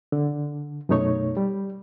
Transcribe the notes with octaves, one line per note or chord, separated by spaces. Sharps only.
D3
F#2 B2 A3 D#4 C#5 C#6
G3